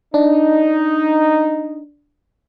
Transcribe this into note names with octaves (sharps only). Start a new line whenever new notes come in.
D4 D#4